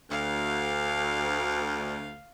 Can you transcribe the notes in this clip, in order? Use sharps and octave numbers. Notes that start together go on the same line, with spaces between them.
D2 F5